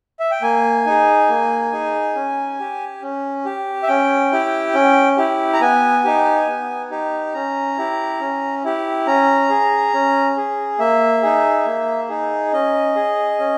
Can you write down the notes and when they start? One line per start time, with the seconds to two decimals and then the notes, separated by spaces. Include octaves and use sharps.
0.20 E5
0.31 G5
0.42 A#3 G#5
0.86 D#4 G#4
1.29 A#3
1.72 D#4 G#4
2.15 C#4
2.59 G4
3.02 C#4
3.45 G4
3.83 E5
3.88 C#4 G5
4.32 E4 G4
4.74 C#4
5.17 E4 G4
5.53 A#5
5.61 B3 G#5
6.04 D#4 G4
6.47 B3
6.90 D#4 G4
7.34 C#4 A#5
7.78 E4 G4
8.20 C#4
8.64 E4 G4
9.07 C#4 A#5
9.49 G#4
9.93 C#4
10.37 G#4
10.79 A#3 E5
11.22 D#4 G#4
11.66 A#3
12.09 D#4 G#4
12.53 C#4 D#5
12.96 G#4
13.39 C#4